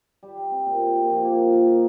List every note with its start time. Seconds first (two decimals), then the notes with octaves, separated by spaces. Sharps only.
0.23 G3
0.37 G3
0.51 C4
0.66 A#2
0.81 C4
0.95 A#2
1.10 F3
1.24 A#3
1.39 F4
1.53 D#3
1.67 D#4